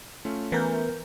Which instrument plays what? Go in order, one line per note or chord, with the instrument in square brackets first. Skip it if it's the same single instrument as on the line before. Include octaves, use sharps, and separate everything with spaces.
[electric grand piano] A3 C#4 F4
[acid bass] E3 [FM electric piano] B3 A#4 G6